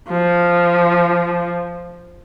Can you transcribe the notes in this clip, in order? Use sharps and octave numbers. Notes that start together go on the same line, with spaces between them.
F3